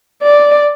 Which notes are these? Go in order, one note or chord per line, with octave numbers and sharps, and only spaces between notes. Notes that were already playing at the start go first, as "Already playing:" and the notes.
D5